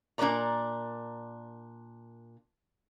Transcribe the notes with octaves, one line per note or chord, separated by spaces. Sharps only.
A#2 D4 A#4 B4 D5 A#5